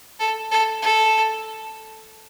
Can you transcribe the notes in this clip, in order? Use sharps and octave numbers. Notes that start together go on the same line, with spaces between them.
A4
A4
A4